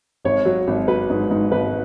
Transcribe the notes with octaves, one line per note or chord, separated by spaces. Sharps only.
G#1 C#5
F#3
G#1
F#3 B4
G#2
G#2
G#1 B4